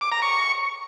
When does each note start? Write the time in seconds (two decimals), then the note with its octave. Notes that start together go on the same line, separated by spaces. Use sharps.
0.01 D6
0.12 A#5
0.22 C#6